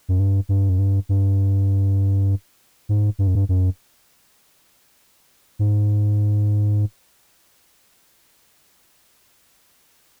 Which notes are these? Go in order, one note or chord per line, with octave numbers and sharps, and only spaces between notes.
F#2
G2
G2
F#2
G2
G2
G#2
G2
F#2
G2
F#2
G#2